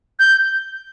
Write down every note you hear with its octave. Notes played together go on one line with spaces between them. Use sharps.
G6